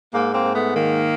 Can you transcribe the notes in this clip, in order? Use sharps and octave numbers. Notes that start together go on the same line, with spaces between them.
G#2 A#3
A#3 C4
G#2
A3 B3
D#3 A#3